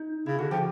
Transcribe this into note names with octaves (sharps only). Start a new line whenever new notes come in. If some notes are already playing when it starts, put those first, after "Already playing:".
Already playing: D#4
C#3 E4
D3 F#4
F3 G4